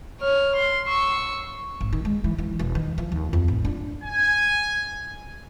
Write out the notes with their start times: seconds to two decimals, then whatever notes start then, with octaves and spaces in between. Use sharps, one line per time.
0.20 C#5 F6
0.56 C6
0.88 C#6 E6
1.81 G#1
1.93 D#3
2.05 G#3
2.24 E3
2.38 E3
2.59 E1
2.75 D#3
2.98 F3
3.12 D#2
3.33 F2
3.48 A1
3.65 D4
4.04 G#5